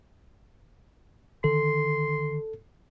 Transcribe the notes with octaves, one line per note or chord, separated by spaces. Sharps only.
D3 D#3 A4 C6